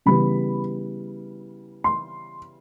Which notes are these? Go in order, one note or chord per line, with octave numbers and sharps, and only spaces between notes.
C#3 E3 G3 B3 B5
C6